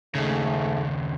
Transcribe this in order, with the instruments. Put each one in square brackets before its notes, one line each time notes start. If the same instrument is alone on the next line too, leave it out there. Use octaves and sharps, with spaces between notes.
[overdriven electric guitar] D#2 C#3 [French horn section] G#2 A3